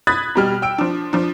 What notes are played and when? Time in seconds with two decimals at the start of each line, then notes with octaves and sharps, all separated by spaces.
0.07 B5 D#6 F#6 G#6 A6 B6
0.35 B2 G3 F6
0.62 G5 E6 D7
0.78 F3 D4
1.13 F3 D4